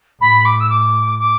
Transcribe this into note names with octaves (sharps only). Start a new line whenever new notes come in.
A2 B5
D6
E6
D6
D6